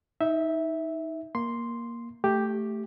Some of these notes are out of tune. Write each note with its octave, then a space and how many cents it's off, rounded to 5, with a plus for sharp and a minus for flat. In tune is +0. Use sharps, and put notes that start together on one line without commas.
D#4 +20 E5 -10
A#3 +10 C6 +0
A3 +0 G4 +0